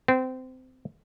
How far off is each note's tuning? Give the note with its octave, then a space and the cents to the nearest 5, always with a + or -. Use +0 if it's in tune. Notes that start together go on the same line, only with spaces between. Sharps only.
C4 -25